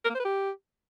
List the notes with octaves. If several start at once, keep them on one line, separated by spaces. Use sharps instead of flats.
A#4
A#3
C5
B4
G4